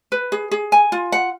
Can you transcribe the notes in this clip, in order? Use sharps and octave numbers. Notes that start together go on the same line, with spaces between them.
B4
G#4
G#4
G#5
F4
F#5